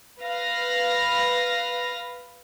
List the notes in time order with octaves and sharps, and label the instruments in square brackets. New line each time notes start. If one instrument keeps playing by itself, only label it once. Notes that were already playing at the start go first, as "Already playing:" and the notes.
[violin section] B4 F5 B5 A#6